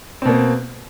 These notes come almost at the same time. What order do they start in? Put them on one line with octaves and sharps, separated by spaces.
C4 B2 A#3